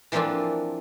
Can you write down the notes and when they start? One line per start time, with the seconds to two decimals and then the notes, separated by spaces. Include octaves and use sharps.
0.12 E3 F3 A#3 C4 D4 F4